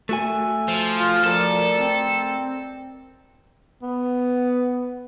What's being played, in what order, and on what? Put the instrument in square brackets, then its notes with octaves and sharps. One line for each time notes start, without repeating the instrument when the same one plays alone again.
[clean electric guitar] A3 F#4 G#5 [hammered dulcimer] E5
[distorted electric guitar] F3
[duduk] F4
[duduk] F3 [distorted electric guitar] A4 [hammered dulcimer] A#4 D5 D#5
[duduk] C4
[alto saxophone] B3